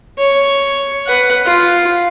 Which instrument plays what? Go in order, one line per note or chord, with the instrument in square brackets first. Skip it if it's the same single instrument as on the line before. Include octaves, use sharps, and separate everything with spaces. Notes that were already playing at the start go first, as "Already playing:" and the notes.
[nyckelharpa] C#5
B4 F#5
F4